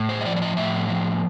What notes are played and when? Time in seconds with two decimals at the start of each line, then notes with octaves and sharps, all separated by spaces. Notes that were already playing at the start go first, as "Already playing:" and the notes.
Already playing: A2
0.09 C5
0.21 D#5
0.25 F3 D5
0.36 D5
0.42 D#5
0.57 A2 E5
0.90 F3